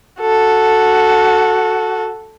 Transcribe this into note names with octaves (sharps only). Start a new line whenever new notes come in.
F#4 A4